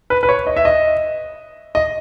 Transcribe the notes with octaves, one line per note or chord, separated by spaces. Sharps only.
B4
B4
C#5
D#5
E5
D#5
D#5